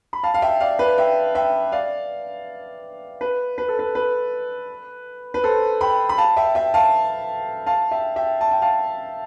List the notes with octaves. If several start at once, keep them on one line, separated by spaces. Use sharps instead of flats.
B5
F5 A5
F5
E5 G5
D5 F5
B4
E5 G5
E5 G5
D5 F5
B4
B4
A4
B4
B4
B4
A4 C5
G5 B5
B5
F5 A5
E5 G5
E5 G5
F5 A5
F5 A5
E5 G5
E5 G5
A5
G5
F5 A5